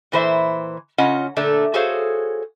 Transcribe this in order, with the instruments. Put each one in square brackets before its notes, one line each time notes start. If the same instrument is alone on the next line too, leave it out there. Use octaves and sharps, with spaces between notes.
[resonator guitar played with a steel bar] A#2 E3 C5 E5
C#3 C#4 F4 D#5 F#5
A#2 D3 A3 D4 A4
F#4 G#4 A4 C5 C#5 F5